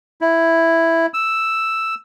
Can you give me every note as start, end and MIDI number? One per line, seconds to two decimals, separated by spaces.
0.21 1.06 64
1.14 1.95 88